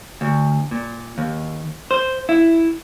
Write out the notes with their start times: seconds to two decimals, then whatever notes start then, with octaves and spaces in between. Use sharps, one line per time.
0.21 D2
0.71 A#2
1.18 D#2
1.91 C5
2.29 E4